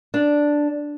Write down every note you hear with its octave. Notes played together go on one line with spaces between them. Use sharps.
D4